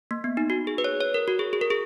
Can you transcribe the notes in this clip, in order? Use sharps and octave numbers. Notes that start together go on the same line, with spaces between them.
A#3
B3
D#4
F#4
G#4
B4
C#5
C#5
A#4
F#4
G#4
G#4
A#4
G#4